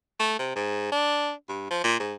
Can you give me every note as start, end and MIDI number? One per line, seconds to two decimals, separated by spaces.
0.19 0.39 57
0.39 0.52 48
0.56 0.91 44
0.92 1.32 62
1.49 1.69 43
1.71 1.80 53
1.84 1.98 46
2.00 2.14 44